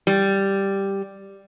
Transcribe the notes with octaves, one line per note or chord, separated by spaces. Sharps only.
G3